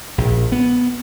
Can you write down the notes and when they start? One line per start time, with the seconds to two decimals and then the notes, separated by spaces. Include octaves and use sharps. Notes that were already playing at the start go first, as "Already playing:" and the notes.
0.18 A#1
0.52 B3